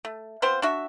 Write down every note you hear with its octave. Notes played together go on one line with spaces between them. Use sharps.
A3
B3 C4 F4 C5
D4 F#4 E5